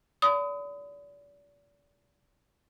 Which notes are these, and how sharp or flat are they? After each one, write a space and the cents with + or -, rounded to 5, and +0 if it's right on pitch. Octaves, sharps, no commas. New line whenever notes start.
D5 -35 B5 +40 D#6 +20